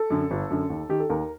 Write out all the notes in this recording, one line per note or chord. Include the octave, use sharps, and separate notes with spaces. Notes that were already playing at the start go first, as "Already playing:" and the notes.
Already playing: A4
F#2 D3
G1
F#2 D3
D#2
D#3 G4
A4
D#2 A#4